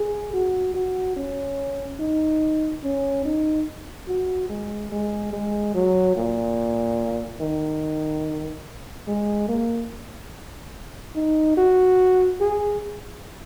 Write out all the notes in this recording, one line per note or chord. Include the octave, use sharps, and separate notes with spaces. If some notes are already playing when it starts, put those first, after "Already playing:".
Already playing: G#4
F#4
F#4
C#4
D#4
C#4
D#4
F#4
G#3
G#3
G#3
F#3
A#2
D#3
G#3
A#3
D#4
F#4
G#4